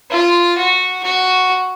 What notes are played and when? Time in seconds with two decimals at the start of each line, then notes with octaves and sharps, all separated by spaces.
0.11 F4
0.58 F#4
1.03 F#4